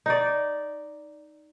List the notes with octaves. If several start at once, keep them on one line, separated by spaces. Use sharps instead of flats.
D#4 D5